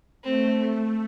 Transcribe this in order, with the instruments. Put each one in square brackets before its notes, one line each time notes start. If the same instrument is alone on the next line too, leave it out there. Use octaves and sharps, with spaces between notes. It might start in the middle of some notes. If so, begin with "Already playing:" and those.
[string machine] A3 [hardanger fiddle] C4